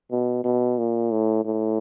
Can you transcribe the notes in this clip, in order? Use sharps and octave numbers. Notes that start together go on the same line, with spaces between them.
B2
B2
A#2
A2
A2